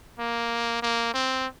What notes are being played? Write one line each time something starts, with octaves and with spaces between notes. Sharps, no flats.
A#3
A#3
C4